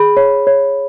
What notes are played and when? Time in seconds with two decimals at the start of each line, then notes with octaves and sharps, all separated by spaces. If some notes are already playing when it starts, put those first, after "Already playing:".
Already playing: G#4 B5
0.17 C#5
0.47 C#5